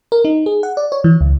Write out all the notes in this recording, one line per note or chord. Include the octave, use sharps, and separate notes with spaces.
A#4
D#4
G#4
F#5
D5
C#5
E3
C#2